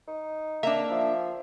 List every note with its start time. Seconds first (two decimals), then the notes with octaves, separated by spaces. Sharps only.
0.08 D#4
0.63 A#3 D4 E5
0.91 F3